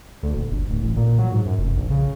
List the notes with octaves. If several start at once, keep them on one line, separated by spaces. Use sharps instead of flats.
D2
D#1
G1
D1
A1
A#2
F#3
G#2
F#2
F1
A#1
C#3